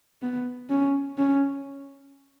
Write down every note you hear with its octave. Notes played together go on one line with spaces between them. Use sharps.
B3
C#4
C#4